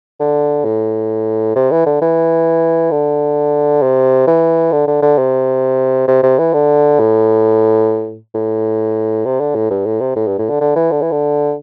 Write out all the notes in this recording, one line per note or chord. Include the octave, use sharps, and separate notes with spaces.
D3
A2
C3
E3
D3
E3
D3
C3
E3
D3
D3
D3
C3
C3
C3
E3
D3
A2
A2
C3
D3
A2
G2
A2
C3
A2
G2
A2
D3
D3
E3
D3
E3
D3